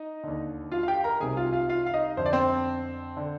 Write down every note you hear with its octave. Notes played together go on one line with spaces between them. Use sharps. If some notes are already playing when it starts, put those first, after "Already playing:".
Already playing: D#4 D#5
D#2 D3
F4 F5
F5
G4 G5
A#4 A#5
C2 C3 D#3 G#4 G#5
F4 F5
F4 F5
F4 F5
F5
D#4 D#5
F2 D3 C5
D5
C4 C5
D3